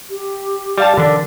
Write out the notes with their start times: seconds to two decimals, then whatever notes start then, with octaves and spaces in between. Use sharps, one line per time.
0.10 G4
0.78 G3 F5 A5
0.97 D3 D#3 F3 D4 A#4